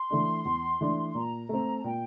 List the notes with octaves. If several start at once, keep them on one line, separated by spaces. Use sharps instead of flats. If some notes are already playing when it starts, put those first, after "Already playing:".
Already playing: C6
E3 A3 D4
E2
E3 A3 D4
A#2 A#5
A3 C4
A5
A#2 G5